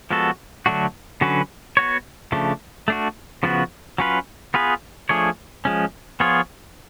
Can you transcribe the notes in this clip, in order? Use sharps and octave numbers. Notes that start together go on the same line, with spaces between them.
F3 G#3 B3 F#4 A4
D3 F#3 A3 D4 F#4
D3 F#3 C#4 F#4 B4
B3 F#4 C#5
C#3 F3 A3 D4
A3 D4 F#4
C#3 F3 B3 F#4
F#3 C#4 F4 B4
B3 F4 G#4 B4
F3 A3 D4 G#4 C#5
F3 G#3 C#4
F3 B3 F4 G#4 C#5